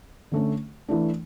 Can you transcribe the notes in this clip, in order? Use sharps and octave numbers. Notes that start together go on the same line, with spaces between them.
D3 A3 C#4
E3 A3 D4